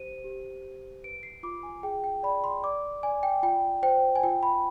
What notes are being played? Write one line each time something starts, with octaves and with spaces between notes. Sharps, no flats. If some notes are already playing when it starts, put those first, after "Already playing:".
Already playing: G4 C5 D#7
G4
G4
B4 D7
C7
F4 D6
G#5
G#4 G5
G5
D5 B5
C6
D5 D6
D5 G#5
G5
F4 G5
C5 G5
G#5
F4 G5
B5